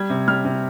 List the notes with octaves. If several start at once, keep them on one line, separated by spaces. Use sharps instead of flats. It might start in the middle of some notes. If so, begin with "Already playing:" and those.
Already playing: G3 G#6
C3
G3 F6
C3